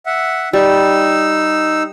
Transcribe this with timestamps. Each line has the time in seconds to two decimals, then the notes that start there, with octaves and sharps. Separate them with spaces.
0.06 E5 F#5
0.53 G3 D#4 E6